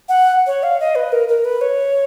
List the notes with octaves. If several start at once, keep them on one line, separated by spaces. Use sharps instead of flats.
F#5
C#5
F5
D#5
B4
A#4
A#4
B4
C#5